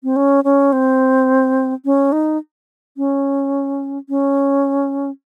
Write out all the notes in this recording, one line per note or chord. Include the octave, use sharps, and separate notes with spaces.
C4
C#4
C#4
C4
C#4
D#4
C#4
C#4